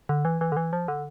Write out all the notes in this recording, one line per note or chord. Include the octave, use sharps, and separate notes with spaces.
D3
E3
E3
D3
E3
F3
D3